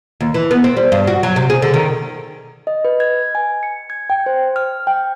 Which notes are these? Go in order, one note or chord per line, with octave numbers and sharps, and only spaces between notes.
D#2
E3
B3
C4
G3
G2
F#4
F#3
C3
G#4
D3
D#3
D#5
B4
G#6
G#5
C#7
G#6
G5
C5
F6
G5